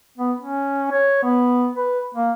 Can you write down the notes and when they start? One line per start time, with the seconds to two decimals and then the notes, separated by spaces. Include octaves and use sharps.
0.18 B3
0.40 C#4
0.91 C#5
1.23 B3
1.76 B4
2.14 A#3